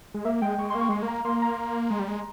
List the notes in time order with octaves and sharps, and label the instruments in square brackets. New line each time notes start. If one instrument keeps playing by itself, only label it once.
[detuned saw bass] G#3
[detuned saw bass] A#3 [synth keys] E5
[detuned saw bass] G#3 [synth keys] G5
[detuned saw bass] G#3 [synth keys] C#6
[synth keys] C6
[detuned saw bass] A#3
[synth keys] C#6
[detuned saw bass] G#3 [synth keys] C6
[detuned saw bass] A#3
[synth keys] A#5
[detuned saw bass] A#3 [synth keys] C6
[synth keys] A#5
[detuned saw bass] G#3
G3
G#3